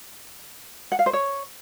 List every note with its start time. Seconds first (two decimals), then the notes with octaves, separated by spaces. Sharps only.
0.92 F#5
0.99 F5
1.06 C5
1.13 C#5